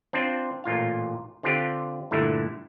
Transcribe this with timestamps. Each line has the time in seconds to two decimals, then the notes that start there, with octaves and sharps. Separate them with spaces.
0.13 C4 D4 F4 C5
0.64 A1 A#2 F4 F5
1.43 D3 C4 D4 F4 G4
2.11 G2 A#2 D3 A3 E4